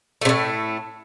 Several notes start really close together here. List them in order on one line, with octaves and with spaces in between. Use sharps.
A3 C3 A2